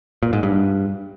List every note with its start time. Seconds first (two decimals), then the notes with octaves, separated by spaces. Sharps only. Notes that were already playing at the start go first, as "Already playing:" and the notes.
0.23 A#2
0.33 G#2
0.43 G2